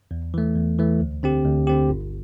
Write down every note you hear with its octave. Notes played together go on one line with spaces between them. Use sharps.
E2
E3 A3
E2
E3 A3
D2
D3 C4 G4
D2
D3 C4 G4
G1